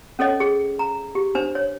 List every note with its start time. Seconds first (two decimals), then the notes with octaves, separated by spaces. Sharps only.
0.19 C#4 A4 C#5 D#5
0.40 G#4
0.79 A#5
1.15 G4
1.35 D4 C5
1.55 C#5